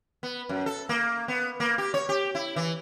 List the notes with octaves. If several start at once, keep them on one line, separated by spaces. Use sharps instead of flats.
B3
F#2
A4
A#3
B3
A#3
G4
C#5
G4
E4
E3